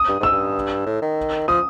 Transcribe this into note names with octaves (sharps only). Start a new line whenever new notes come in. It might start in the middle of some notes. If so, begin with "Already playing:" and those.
Already playing: D#6
G2
G#2 E6
G2
A2
D#3
F3 D#6